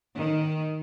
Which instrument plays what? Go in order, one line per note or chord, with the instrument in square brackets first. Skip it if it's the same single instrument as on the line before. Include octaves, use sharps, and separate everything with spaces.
[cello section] D#3